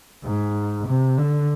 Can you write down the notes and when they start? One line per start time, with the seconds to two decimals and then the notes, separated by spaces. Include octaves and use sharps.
0.23 G#2
0.87 C3
1.18 D3